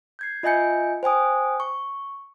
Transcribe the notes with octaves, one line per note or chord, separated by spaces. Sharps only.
G6 G#6 C7
F4 D#5 E5 G#5 G6 C#7
C5 G5 G#5 D#6
C#6